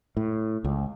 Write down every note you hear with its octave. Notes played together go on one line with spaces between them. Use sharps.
A2
C#2